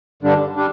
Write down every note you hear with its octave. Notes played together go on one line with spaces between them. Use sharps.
G2 D3 G3 D4
D3 G3 D4